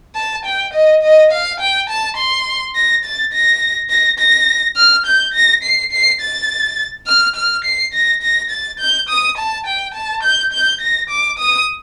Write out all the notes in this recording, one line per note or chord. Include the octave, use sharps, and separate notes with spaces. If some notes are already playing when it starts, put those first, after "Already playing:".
A5
G5
D#5
D#5
F5
G5
A5
C6
A#6
A6
A#6
A#6
A#6
F6
G6
A#6
C7
C7
A6
F6
F6
C7
A#6
A#6
A6
G6
D#6
A5
G5
A5
G6
G6
A#6
D6
D#6